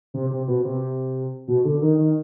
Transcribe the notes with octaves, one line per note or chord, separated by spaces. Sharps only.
C3
C3
B2
C3
B2
D3
D#3
D#3